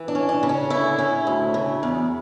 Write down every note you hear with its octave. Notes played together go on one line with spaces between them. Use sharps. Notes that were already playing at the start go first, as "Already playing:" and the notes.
Already playing: E3
D4
C#4
D4
C#3
C#4
D3 E4
C#4
D2
C#3
E2